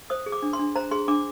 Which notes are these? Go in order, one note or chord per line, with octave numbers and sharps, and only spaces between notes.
C5 D#6
G#4
D6
D4
C6
D4
C5 A#5
G#4 C6
D4 D6